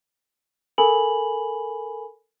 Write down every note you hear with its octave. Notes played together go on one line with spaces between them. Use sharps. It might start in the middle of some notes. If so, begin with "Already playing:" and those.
A4 A#4 G#5 B5 F#7